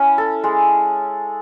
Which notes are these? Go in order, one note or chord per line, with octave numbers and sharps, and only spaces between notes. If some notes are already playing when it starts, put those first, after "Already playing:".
Already playing: C#4 E4
A4
G#3